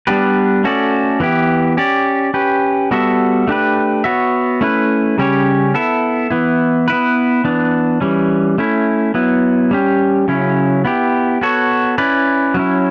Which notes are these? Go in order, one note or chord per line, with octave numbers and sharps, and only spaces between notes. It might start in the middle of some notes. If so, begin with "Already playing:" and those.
G3 B3 D4 G4 B4
A3 C#4 F#4 A4 D5
E3 B3 E4 G4
C#4 G4 D5
C#4 G4 B4
G3 B3 F#4 A4 E5
A3 D4 G4 B4
B3 F#4 C#5 E5
A3 C#4 E4 B4
C#3 G3 C#4 G4 C#5
B3 E4 A4 E5
E3 B3 E4
B3 E4 B4
E3 B3 D4
E3 G3 C#4
A3 C#4 E4
F#3 B3 E4
G3 C#4 G4
C#3 F#3 C#4 E4
B3 E4 G4
B3 F#4 A4 C#5
C#4 E4 B4 D5
F#3 C#4 E4